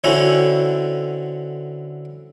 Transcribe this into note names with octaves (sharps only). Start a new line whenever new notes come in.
D3 C4 C#4 E4 F#4